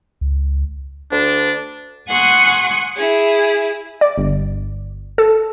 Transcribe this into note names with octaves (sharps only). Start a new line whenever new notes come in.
C#2
D2 D4
F#5 G#5 C6 C#6 D#6 F#6
E4 G#4
D5
G1
A4